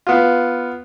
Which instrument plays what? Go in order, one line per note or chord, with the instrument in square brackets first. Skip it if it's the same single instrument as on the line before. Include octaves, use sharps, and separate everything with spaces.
[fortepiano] B3 F4